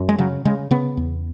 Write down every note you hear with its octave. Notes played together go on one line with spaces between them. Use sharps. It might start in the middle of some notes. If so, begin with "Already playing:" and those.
Already playing: F#2
G#3
C#3 F#3
C#3 G#3
C#3 B3
E2